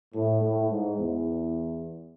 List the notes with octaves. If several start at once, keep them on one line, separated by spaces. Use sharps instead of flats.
A2
A2
G#2
E2